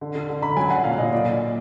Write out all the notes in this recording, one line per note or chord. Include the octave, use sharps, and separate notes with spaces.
D3
D3
D3
D3 B5
F#3 G#5
F#3 F#5
A#2 F5
A#2 D#5
A#2 D5